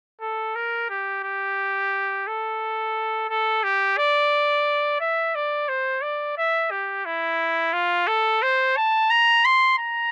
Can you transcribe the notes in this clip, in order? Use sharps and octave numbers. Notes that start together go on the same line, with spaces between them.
A4
A#4
G4
G4
A4
A4
G4
D5
E5
D5
C5
D5
E5
G4
E4
F4
A4
C5
A5
A#5
C6
A#5